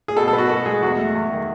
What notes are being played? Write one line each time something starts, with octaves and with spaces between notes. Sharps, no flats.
G#4
B2 A4
A4
B3
F#4
B2 F#4
G#3 G#4
E2 F#4
A3
E2
D#3